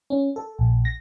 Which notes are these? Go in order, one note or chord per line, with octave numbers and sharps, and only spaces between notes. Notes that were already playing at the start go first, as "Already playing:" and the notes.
C#4
A4
A#1
A#6